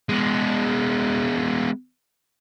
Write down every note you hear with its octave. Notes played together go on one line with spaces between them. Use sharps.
G#3 B3